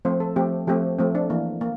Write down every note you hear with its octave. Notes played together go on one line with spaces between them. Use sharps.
F3 A3 C4 C5
A4
F3 A3 C4 G4
F3 A3 C4 G4
F3 A3 C4
D4
E3 A#3
A#3